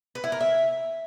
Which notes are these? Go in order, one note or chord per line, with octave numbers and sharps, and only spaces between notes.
B4
E4
A#4
E5